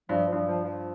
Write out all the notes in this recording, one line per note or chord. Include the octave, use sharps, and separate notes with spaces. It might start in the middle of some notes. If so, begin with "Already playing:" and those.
G2 F3
G2 F3
F3
F3